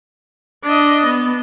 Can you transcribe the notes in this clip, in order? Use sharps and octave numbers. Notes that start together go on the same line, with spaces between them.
D4 D#5
B3